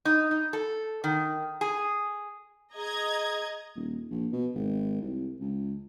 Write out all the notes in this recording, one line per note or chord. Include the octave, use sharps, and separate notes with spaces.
D#4
D#4
A4
D#3
G#4
G#4 D#5 A#5 G#6
D#1
A#1
B2
G#1
C2
C#2